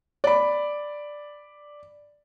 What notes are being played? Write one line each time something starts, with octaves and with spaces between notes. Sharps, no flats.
D5 B5